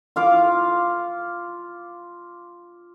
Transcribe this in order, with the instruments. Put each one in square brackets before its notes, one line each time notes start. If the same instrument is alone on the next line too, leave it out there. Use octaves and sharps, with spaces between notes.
[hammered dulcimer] F4 F5 D6